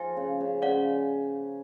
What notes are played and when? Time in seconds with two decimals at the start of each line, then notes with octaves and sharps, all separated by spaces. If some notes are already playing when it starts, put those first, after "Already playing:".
Already playing: F3 F4 G#4 F5 G#5
0.17 C#3
0.40 C#3
0.62 C#3 D5 F#5